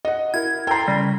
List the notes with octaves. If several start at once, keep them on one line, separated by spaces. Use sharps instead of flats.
D#5 F#5
E4 A#4 G#6
A4 C5 G5 A#5
C#3 G3